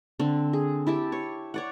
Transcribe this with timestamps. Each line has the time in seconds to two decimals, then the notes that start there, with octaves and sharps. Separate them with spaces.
0.19 D3 C4
0.53 G#4
0.87 E4 G4 A5
1.12 C#5
1.54 C#5 D5 F#5